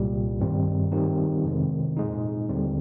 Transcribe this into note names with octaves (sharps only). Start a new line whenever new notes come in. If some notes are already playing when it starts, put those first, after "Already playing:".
Already playing: C2 A#2 G3
G2 D#3 G3 C4
D#3 G3 C4 D#4 G4
F2 C3 D#3 G#3 C4
A#2 G#3 D#4
D#2 D3 G3 C4